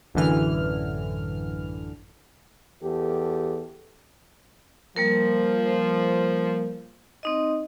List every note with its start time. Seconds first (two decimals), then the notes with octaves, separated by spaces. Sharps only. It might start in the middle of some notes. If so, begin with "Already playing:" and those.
0.14 A1 F#2 D3 E3 F6
2.83 E2 G4 A4
4.96 F3 G3 A#3 A#4
7.23 C4 D#4 D#5